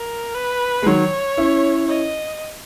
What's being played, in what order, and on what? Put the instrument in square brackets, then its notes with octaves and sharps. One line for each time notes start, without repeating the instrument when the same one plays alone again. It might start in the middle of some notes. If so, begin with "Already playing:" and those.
Already playing: [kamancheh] A#4
B4
[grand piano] G#3
[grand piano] D#3 F#3 [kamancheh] C#5
[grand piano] C#4 E4
[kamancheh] D#5